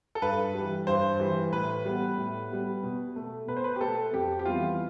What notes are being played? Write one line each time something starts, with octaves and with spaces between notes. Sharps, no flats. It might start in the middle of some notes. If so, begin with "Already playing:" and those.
A4
G2 B4
E3 G3
G2 C5
E3 G3
A2 B4
G3 B3
A2
G3 B3
B2
A3
B2 B4
C5
B4
G4
A3 A4
F2 G4
G4
E3 G3 B3 F4